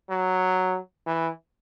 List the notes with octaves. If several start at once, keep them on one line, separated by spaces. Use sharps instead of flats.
F#3
E3